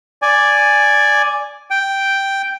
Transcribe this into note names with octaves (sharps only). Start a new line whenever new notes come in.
D5 G#5
G5